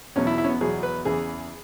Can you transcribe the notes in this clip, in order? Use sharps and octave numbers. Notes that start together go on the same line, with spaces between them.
E2 B2 F#3 C#4
E4
E4
C#4
B3
E2 B2 F#3 G#4
B4
E2 C#3 E3 G#4